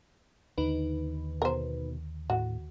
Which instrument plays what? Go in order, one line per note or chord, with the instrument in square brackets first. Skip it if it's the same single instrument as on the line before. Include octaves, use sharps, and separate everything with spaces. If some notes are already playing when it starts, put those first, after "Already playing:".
[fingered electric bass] D#2 D3 [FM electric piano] D#4 B4
[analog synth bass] B2 [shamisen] A#4 C5
[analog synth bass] A2 [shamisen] F#4